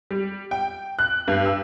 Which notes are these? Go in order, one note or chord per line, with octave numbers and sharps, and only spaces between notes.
G3
G5
F#6
G2
E6